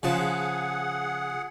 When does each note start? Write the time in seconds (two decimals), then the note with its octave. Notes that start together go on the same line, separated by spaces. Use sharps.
0.03 C#3 F3 G#4 F#5 A5